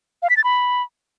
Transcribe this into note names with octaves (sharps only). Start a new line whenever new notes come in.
F5
B6
A6
B5